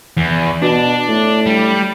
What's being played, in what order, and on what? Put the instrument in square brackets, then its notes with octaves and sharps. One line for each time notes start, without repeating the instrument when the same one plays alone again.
[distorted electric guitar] E2
[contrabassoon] B2 [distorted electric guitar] D4
[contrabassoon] A2
[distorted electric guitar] G3